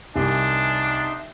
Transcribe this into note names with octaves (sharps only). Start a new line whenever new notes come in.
C2 D4 D#4 E5 G#5 C6